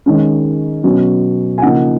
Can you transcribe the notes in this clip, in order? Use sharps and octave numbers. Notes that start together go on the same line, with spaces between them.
D#3 G#3 C#4
B2 F#3 C#4
G#5
C#3 F3 A#3 D#4 F#5